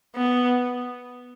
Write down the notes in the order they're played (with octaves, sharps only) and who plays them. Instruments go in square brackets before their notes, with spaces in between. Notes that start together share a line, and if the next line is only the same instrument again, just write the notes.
[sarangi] B3